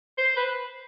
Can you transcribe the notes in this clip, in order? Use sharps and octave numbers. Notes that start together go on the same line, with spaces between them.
C5
B4